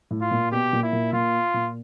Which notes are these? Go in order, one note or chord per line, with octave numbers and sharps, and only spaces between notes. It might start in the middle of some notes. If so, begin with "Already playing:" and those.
A2
F4
A#2
B2 G4
A#2
E4
A#2
A#2 F4
A#2